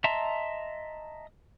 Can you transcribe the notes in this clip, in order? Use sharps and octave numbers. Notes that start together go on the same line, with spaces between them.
D#5 E5 A5 A#5 C6